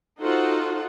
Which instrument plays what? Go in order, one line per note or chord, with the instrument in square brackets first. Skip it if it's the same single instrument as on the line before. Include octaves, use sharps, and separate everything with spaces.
[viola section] D#4 F4 F#4 A4 C5 F#5